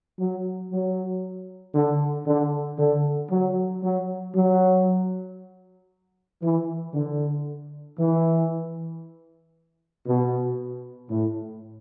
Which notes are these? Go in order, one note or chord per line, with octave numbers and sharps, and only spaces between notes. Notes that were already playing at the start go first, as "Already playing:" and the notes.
F#3
F#3
D3
D3
D3
F#3
F#3
F#3
E3
D3
E3
B2
A2